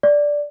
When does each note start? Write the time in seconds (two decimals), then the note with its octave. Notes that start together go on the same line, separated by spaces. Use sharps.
0.03 D5